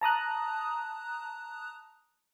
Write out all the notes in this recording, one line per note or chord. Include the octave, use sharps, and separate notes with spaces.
A5 A#5 D#6 F#6